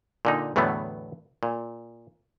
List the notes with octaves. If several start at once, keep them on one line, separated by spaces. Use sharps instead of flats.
A#2 D3 D#4
E2 A2 D3 F#3 A3 B3
A#2